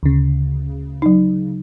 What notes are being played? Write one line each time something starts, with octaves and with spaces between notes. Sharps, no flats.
D2 C#3
F#3 D#4